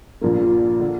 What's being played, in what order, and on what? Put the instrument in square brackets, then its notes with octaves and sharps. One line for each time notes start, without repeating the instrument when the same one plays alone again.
[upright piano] A#1 A#2 F3 A#3
D3